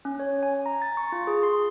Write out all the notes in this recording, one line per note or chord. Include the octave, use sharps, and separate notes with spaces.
C#4
C#5
G#5
A#5
A6
C#6
F4
G#4
C6